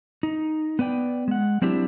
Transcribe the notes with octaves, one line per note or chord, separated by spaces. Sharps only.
D#4
B3 B4 D5 G5
G#3 F#5
F#3 C4 D4 E4 G4